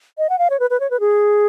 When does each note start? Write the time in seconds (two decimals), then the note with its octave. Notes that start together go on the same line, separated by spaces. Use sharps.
0.18 D#5
0.30 F#5
0.39 F5
0.50 C#5
0.60 B4
0.70 B4
0.80 C#5
0.91 B4
1.00 G#4